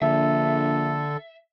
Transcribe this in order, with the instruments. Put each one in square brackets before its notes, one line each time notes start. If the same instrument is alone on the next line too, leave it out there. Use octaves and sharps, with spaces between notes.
[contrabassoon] A#1 [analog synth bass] D3 [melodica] A4 [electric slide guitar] E5